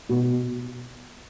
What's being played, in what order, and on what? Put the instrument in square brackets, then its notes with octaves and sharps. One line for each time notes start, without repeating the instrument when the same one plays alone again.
[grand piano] B2